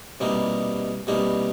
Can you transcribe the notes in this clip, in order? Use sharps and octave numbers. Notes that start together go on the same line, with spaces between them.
C2 B2 G3 A#3 D#4
C2 B2 G3 A#3 D#4